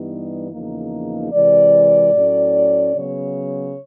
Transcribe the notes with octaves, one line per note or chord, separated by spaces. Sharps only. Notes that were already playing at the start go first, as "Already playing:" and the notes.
Already playing: G2 E3 G3 B3 D#4
E2 C#3 F3 A#3 D#4
C3 E3 G#3 D5
A2 F#3 A3 C#4
C#3 F#3 B3 C#5